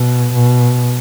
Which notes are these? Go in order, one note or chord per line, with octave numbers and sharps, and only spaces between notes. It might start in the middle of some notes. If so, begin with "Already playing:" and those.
Already playing: B2
B2